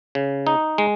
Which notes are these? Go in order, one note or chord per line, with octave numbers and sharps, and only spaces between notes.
C#3
D#4
G#3